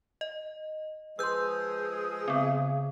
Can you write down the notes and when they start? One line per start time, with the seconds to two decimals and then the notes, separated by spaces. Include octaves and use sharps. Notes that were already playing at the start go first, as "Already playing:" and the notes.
0.21 D#5
1.19 F3 G#3 G#4 B4 C6 E6 G6
2.28 C#3 B3 C4